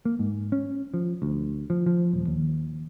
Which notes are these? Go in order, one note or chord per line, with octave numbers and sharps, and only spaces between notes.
A#3
G#2
C#4
F3
D2
F3
F3
D#1
D#2